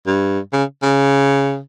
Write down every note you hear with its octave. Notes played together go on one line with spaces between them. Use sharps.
G2
C#3
C#3